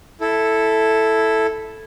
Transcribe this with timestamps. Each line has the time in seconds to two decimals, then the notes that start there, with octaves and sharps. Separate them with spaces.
0.21 E4 A4